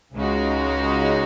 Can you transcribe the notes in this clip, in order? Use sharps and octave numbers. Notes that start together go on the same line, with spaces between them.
C#2 C#3 G#3 D#4 F#4